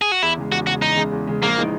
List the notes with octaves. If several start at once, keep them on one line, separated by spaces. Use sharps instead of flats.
G#4
F#4
E2 E4
C#3 G#3
E2 F#4
C#3 G#3 F#4
E2 D#4
C#3 G#3
E2
C#3 G#3
A#1 A#3
E3 G#3 D#4